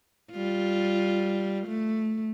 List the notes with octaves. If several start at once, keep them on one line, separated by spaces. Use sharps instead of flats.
G3 F4
A3